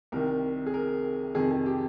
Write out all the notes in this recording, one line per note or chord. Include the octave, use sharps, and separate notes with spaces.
C2 C3 D#3 A#4
G#4
A#4
F2 C3 D#3 G#4
G#4
G4